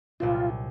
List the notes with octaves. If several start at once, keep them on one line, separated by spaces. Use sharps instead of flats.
C2 A#2 F#3 C4 F4